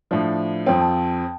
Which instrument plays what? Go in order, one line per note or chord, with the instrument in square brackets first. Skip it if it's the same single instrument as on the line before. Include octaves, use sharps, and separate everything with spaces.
[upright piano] A2 F3 D4
[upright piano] F2 F3 C4 [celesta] G5
[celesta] A5